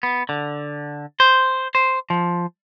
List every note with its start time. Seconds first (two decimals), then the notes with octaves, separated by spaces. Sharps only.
0.03 B3
0.29 D3
1.20 C5
1.75 C5
2.10 F3